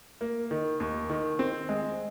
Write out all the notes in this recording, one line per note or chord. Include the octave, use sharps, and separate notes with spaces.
A#3
D#3
D#2
D#3
C4
G#3